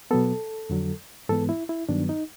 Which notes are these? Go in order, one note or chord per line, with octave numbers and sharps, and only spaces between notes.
B2 F#3 B3 A4
F2 D3 F#3
G#2 E3 G#3 B3 A4
E4
E4
G2 D#3 F#3 B3 D4
D#4